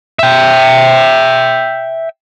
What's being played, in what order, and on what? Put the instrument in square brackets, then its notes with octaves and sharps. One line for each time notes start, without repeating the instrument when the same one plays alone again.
[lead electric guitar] E5 G5